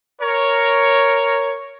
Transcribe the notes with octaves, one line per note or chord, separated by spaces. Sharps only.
A#4 C#5